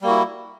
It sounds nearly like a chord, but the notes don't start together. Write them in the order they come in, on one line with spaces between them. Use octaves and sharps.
G3 A#3 F#4 E4